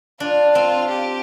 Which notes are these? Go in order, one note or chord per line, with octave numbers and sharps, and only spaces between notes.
D4 F4
C4 F4
G4